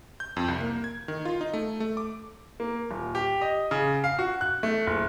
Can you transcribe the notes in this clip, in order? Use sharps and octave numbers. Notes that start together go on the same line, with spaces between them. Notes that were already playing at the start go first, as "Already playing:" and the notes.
G6
F2
C2
A#3
G#6
D#3
F4
D#4
A3
A3
D6
A#3
D#1
G4
D#5
C#3
F5
F#4
F#6
A3
F#1